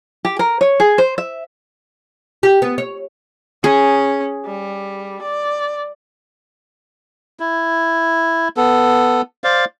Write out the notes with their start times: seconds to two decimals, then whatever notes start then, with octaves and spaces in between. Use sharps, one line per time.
0.25 G4
0.39 A#4
0.61 C#5
0.80 G#4
0.98 C5
1.18 E5
2.43 G4
2.62 B3
2.78 C#5
3.64 C#4 G#4
4.45 G3
5.22 D5
7.40 E4
8.57 B3 A4
9.44 C5 D5 F5